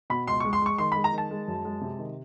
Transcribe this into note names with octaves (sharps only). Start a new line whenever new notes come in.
B2 B5
C#2 C6
C#6
G#3
C6
G#3 C#6
D#3 C6
B5
G#3
A#5
D#3
A5
G#3
F#2
G#3
C3
D#3